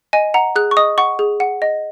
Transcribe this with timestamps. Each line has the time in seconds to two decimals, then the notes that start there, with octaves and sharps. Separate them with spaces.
0.13 D#5 G#5
0.34 F#5 A#5
0.56 G#4 F#6
0.71 C#6
0.77 D#5 D#6
0.98 F#5 C#6
1.19 G#4
1.40 F#5
1.62 D#5